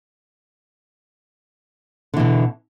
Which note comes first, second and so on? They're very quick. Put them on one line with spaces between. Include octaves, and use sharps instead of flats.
D3 E3 B2